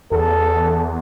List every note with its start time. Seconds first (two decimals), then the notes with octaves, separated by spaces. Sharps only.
0.12 E2 A4